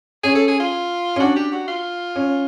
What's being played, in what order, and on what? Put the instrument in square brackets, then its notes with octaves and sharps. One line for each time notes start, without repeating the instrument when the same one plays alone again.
[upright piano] C#4 [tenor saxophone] G#4
[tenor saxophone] A4
G#4
F4
[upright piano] C#4
[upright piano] D4 [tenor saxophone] F#4
[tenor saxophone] G4
F#4
F4
[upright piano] C#4